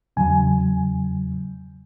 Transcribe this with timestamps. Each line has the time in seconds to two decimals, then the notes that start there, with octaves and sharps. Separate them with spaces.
0.17 E2 C#3 F#3 G#5